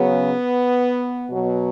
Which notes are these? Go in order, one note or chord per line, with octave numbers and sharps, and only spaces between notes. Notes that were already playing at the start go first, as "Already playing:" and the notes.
Already playing: C#3 F#3 B3
B2 F#3